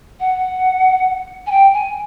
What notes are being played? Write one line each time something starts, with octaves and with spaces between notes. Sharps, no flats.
F#5
G#5
G5
G#5